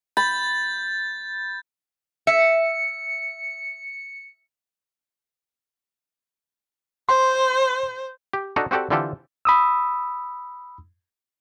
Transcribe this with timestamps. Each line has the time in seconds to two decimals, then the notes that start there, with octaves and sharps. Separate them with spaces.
0.17 B5 G6 A6
2.27 E5 C#7
7.09 C5 C6
8.33 G4
8.56 D4 D#4 F#4 A4 D#5 A#5
8.71 C4 F#4 G4 A4 D5
8.90 D3 E3 C4 F4 G4 A4
9.45 B5 D#6 E6